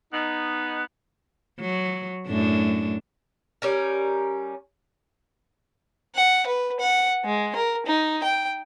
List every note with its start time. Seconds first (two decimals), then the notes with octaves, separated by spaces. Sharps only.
0.12 B3 D#4
1.61 F#3
2.28 F#2 A2 D4
3.62 G3 C#4 A#4
6.15 F#5
6.46 B4
6.80 F#5
7.25 G#3
7.55 A#4
7.86 D#4
8.23 G5